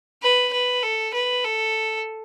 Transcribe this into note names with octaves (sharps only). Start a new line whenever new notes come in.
B4
B4
A4
B4
A4